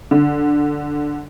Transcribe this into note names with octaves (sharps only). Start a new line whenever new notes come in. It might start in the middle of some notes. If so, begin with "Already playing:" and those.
D3